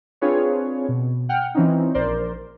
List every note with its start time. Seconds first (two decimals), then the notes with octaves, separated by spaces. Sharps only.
0.21 C4 D4 F4 G#4 B4 C#5
0.89 B2
1.29 F#5 G5 F6
1.55 E3 C4 C#4 D#4
1.94 A#1 A#4 C5 D5 C6